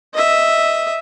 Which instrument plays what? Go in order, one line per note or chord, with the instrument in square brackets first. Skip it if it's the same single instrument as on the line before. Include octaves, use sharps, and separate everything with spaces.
[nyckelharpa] D#5 E5